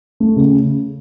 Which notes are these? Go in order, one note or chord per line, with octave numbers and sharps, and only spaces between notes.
A3
C#3